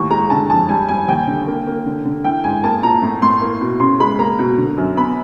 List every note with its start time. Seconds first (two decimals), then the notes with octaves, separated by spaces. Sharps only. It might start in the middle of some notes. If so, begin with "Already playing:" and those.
Already playing: D#2 A2 C#6
0.10 G#3 A#5
0.30 D3 A5
0.50 F2 A5
0.69 G3 G#5
0.89 G3 G#5
1.08 D#2 G5
1.27 D3
1.47 A#3
1.67 A#3
1.86 D3
2.05 D3
2.24 E3 G5
2.44 G#2 G#5
2.64 A#3 A5
2.83 A#2 A#5
3.02 A2
3.22 A2 C6
3.41 A#3
3.61 B2
3.80 C#3 C6
4.00 G#3 B5
4.19 A#3 A#5
4.39 B2
4.58 D3
4.78 F#2
4.97 B3 B5